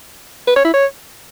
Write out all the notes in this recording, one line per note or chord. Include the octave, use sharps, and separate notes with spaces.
B4
C#5
E4
C#5